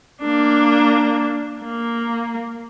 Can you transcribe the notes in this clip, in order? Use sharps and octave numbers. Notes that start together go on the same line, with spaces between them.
A#3 D4
A#3